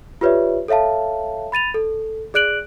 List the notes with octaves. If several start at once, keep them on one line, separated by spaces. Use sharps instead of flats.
F4 G4 B4 C#5 D5 E5
A4 C#5 E5 F5 A5
B5 A6 D#7 F7
A4
G#4 D5 F#6 D7 F#7